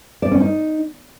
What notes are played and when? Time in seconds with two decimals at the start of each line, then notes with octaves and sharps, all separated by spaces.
0.22 D5
0.31 C#4
0.41 D#4